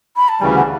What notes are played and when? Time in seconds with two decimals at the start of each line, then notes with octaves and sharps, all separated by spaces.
0.16 B5
0.28 A5
0.40 D2 C#3 E3 G3 G5
0.55 F#5